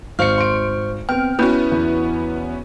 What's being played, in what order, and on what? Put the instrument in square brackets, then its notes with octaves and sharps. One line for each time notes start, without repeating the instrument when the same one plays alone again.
[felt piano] G#1 [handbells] C5 C#6 F6 [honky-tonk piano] F5 C#7
[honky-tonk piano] C6 D7
[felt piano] B3 C4 [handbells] G5 [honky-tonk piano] F6
[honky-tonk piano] B3 C#4 F#4 [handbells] E4 B4 [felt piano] G6
[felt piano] E2